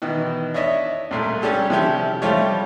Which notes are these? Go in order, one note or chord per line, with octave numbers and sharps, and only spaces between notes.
B2 D#3 E3
D4 E4 C#5 D#5 E5
C2 A#2 A3
G3 C#4 D4 G4 A4
C3 D#3 F3 C#4 E4 G4
F3 G3 A3 F4 G4 C#5